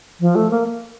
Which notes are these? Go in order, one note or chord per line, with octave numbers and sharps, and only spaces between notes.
F3
A3
A#3